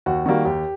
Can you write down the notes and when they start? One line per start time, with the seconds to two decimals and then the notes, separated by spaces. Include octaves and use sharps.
0.06 D#2 F#4
0.26 D#3 G3 A#3 F#4
0.45 D#2 G4